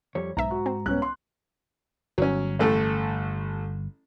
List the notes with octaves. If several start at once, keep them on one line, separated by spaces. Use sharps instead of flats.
F2 G3 C#5
B1 G#2 E5 A#5
F#4
C4
C2 B3 C#4 F#6
C6
G1 F#3 C#4
A1 A3 A4